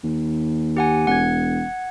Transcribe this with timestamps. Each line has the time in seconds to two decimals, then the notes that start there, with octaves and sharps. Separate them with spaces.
0.04 D#2
0.77 G4 F#5 G#5
1.07 E1 F#5 G#6